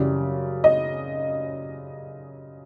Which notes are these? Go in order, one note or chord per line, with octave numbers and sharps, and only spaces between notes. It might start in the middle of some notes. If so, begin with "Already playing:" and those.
Already playing: F#2 C#3 E3 G3 D5
D#5